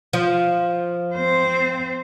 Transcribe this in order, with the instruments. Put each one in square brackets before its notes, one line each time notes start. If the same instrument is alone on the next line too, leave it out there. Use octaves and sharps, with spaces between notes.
[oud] F3
[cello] C4 C5